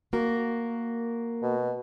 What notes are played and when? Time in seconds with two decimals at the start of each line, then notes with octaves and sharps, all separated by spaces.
0.13 A#3 F#4 A#4
1.43 B2